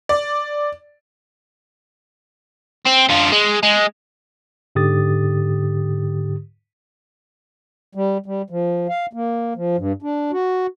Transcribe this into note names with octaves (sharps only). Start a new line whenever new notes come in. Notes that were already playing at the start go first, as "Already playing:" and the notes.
D5
C4
D3 F4
G#3
G#3
G#2 D3 G4 D#6 A6
G3
G3
F3
F5
A#3
F3
G2
D4
F#4